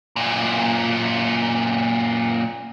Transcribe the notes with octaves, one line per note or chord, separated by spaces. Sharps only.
F#2 A#2